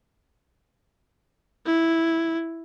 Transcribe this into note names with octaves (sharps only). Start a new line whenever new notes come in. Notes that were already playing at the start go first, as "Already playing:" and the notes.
E4